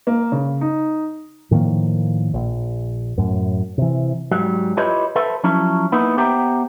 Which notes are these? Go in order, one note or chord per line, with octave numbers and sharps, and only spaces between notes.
A#3
C#3
D#4
A2 D#3 F3 A#3
A#1
F#2 A2
C3 E3
G#2 F#3 G3
E4 F4 G4 B4 C#5 D#5
A4 B4 C5 E5
F3 F#3 C#4 E4
A#3 B3 D#4 E4 B4
B3 G4 C5 E5 G5 A#5